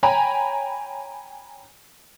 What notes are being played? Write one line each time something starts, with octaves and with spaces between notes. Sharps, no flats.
C#5 G5 G#5 A#5 B5